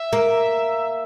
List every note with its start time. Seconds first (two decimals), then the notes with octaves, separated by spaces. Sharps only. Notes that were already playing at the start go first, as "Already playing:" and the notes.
Already playing: E5
0.13 A#3